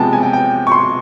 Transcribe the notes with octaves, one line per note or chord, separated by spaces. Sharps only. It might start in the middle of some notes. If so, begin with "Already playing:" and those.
Already playing: C3 F3 G#3 B3 G5 A5
G#5
G5
G5
C#6
C6